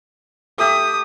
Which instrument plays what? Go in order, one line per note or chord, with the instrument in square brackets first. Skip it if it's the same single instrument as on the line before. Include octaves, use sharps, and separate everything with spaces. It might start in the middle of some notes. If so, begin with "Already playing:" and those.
[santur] A3 G4 E5 [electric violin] D#6